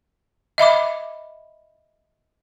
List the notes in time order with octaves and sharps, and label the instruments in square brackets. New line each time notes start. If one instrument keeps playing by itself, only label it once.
[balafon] D#5 E5 B5 D6